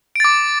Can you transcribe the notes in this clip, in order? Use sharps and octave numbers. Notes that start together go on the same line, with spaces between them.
D6 A6 D7